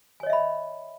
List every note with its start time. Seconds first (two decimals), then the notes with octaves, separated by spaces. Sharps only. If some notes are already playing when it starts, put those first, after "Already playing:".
0.20 G#5
0.23 C#5
0.26 D#5
0.30 E5
0.33 B5